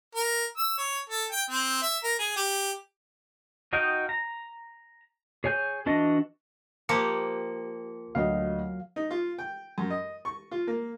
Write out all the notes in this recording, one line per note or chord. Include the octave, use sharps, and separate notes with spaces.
A#4
E6
C#5
A4
G5
C4
E5
A#4
G#4
G4
D#4 F#4 D#5 F5 G5
A#5
G#4 C#5 G#5 G6
E3 D4 F#4 D#5
F3 A#3 G4 C#7
D2 F#3 D#5 F5
D#4
F4
G5
F#2
D#5
C#6
F4
A#3